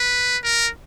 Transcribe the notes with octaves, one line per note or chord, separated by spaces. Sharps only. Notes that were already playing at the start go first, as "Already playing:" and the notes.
Already playing: B4
A#4